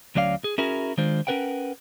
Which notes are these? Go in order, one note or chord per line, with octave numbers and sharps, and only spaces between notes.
D2 F#3 C#4 D5 F5
G#4
C#4 E4 F#4 G#4 A#4
D#3 G#3 D4 F4 C5
C#4 D4 A#4 B4 F#5 G5